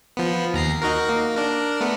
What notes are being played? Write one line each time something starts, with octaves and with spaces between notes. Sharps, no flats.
F3 B3
D#2 A#5 C7
D#4 F#4 A#4
A#3
D4 A#4
A3 B3